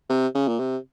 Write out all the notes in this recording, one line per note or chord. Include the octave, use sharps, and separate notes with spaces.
C3
C#3
A#2
C3